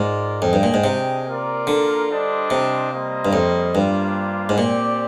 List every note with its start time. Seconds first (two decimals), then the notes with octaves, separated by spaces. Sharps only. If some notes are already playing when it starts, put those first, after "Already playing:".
Already playing: G#2 F4 A#4 D5
0.42 F2 D4 G#4 D#5 G5
0.53 G2
0.63 A#2
0.74 G#2
0.84 C3
1.26 A#3 F4 A#4 D5
1.67 D3
2.09 G3 D4 F4 C5 D#5
2.50 C3
2.92 G3 A#3 F4 C5 D#5
3.25 G2
3.33 F2
3.74 G2 G3 A#3 D4 F4 C5
4.49 G#2
4.57 A#2 C4 G4 D5